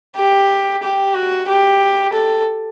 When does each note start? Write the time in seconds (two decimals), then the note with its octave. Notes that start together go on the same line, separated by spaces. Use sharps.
0.17 G4
0.83 G4
1.14 F#4
1.48 G4
2.13 A4